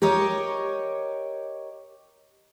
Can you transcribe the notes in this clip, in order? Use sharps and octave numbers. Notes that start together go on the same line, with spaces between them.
G4 A#4 C#5 D#5